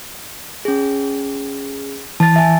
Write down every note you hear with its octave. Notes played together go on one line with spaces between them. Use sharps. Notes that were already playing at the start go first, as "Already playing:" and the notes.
C#4 G#4
E3 A5 A6
E5 G#5